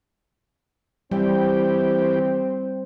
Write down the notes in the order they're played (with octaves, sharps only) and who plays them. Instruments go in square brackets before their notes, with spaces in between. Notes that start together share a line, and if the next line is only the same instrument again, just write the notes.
[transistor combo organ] E3 G4 [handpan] G3 [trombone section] C4